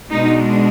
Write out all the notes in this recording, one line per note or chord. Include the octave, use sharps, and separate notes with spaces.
B2 G#3 D4 D#4